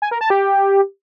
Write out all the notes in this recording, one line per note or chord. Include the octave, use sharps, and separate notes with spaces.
G#5
A#4
A5
G4